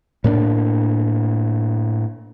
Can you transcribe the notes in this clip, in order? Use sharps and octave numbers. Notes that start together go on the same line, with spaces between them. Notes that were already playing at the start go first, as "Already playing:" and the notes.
A2 A#3 B3 D4